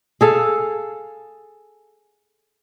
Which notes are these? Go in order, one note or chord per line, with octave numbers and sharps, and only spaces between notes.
G#4 A4 F5